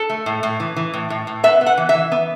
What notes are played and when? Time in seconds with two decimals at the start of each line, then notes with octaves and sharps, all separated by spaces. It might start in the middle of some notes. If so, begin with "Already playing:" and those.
Already playing: A4
0.10 A3
0.26 A2
0.43 A2
0.60 E3
0.76 E3
0.94 A2
1.10 A2
1.27 A2
1.43 B3 E5
1.61 B3
1.67 F#5
1.77 E3
1.89 E5
1.94 E3
2.12 B3